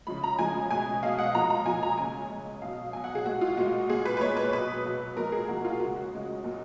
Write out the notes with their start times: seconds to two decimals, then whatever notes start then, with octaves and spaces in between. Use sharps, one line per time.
0.07 C#3 F3 G#3 B5
0.24 A#5
0.39 C#3 F3 G#3 G#5
0.71 B2 G#3 G#5
1.03 B2 G#3 F5
1.19 F#5
1.35 A#2 F3 G#3 A#5
1.50 A#5
1.66 A#2 F3 G#3 G#5
1.83 A#5
1.98 C#3 G#3 G#5
2.30 C#3 G#3
2.62 B2 F#3 F5
2.93 B2 F#3 G#5
3.04 F#5
3.15 G#4
3.26 A#2 G#3 F#4
3.41 F4
3.57 A#2 G#3 F#4
3.89 A#2 G#3 G#4
4.05 B4
4.17 B4
4.21 A#2 G#3 C#5
4.37 B4
4.53 B2 F#3 B4
4.85 B2 F#3
5.17 A#2 F3 G#3 A#4
5.32 G#4
5.48 A#2 F3 G#3 F#4
5.65 F4
5.80 C#3 G#3 F#4
5.96 F#4
6.12 C#3 G#3
6.44 A#2 F#3